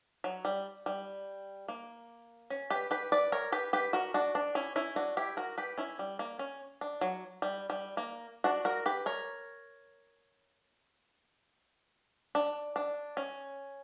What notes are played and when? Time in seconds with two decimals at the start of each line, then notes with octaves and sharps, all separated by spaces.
0.24 F#3
0.45 G3
0.86 G3
1.68 A#3
2.50 C#4
2.70 G4 B4
2.91 G4 B4
3.12 B4 D5
3.32 A#4 C#5
3.52 G4 B4
3.73 G4 B4
3.93 F#4 A#4
4.14 D4 F#4
4.35 D4
4.55 C#4 E4
4.76 C#4 E4
4.96 D4 F#4
5.17 E4 G4
5.37 F#4 A#4
5.58 G4 B4
5.78 C#4 E4
5.99 G3
6.19 A#3
6.39 C#4
6.81 D4
7.01 F#3
7.42 G3
7.70 G3
7.97 A#3
8.44 D4 F#4
8.65 F#4 A#4
8.86 G4 B4
9.06 A#4 C#5
12.35 D4
12.76 D4
13.17 C#4